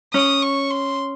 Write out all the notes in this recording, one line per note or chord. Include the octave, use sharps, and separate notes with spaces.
C#4 D#6
C#6
C6